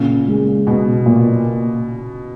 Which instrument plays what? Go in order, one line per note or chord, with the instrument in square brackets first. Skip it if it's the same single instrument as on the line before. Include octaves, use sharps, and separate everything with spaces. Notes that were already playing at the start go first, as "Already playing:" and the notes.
Already playing: [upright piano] A#2 [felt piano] C#3
[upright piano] G#3
[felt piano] B2 [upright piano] B3
[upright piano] A#2